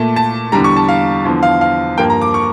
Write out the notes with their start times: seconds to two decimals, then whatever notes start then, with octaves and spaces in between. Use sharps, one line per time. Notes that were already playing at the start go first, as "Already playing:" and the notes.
Already playing: A#2 A3 A5
0.16 A5
0.52 E2 D3 G3 A#5
0.64 C#6
0.76 A5
0.89 F5
1.25 E2 D3 F3
1.43 F5
1.61 F5
1.98 G2 F3 A#3 G5
2.10 A#5
2.22 D6
2.34 C#6